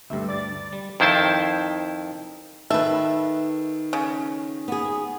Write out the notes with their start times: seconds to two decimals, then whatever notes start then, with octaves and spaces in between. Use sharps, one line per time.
0.10 D2 G2 G3 A3 E5
0.28 D5 A6
0.73 G3
1.00 F2 D#3 E4 C5 A5
2.70 D#3 A4 B4 E5
3.93 C#3
4.68 B3 G#4